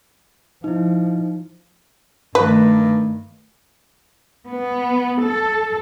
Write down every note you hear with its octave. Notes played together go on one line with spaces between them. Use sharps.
F3 D#4 E4
G2 D#3 A3 B4
B3
A4